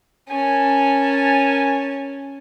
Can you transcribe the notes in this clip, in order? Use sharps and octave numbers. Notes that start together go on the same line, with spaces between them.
C#4 A#4 G#5 A5